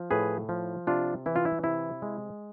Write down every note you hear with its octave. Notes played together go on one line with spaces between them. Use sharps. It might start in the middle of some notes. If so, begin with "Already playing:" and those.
Already playing: F3
A2 G#4 B4
F3
C3 D4 F4
E3 E4
F4
E4
C3 E4
G#3